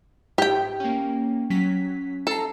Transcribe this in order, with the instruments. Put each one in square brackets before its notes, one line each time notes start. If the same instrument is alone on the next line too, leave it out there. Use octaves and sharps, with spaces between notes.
[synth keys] G#2 B6 [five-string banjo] G4 G5
[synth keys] A#3 C#4
F#3 C#4 B6
[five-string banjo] A4 [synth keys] A#5 A6 C7